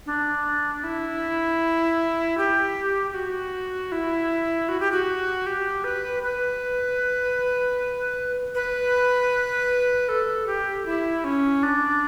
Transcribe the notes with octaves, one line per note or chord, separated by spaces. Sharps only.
D4
E4
G4
G4
F#4
E4
F#4
G4
F#4
G4
B4
B4
B4
A4
G4
E4
C#4
D4